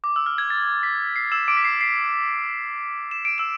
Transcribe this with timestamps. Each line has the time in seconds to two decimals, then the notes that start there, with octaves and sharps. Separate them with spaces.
0.04 D6
0.16 E6
0.26 F6
0.38 G#6
0.50 A6
0.83 B6
1.16 C7
1.32 E6 E7
1.48 D6 D7
1.57 B6
1.65 C7
1.81 C7
3.11 E7
3.25 D7
3.38 E6 E7